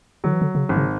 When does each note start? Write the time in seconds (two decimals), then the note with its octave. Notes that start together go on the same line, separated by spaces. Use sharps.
0.24 D3 F#3
0.33 E3
0.42 D3
0.55 C#3
0.69 G#1
0.77 C#3